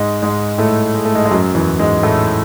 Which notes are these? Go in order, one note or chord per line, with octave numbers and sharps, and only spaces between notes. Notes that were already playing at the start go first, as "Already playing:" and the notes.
Already playing: G#2 G#3
G#2 G#3
A2 A3
G#3
A3
G#2 G#3
G#3
F#2 F#3
E2 E3
G#2 G#3
A2 A3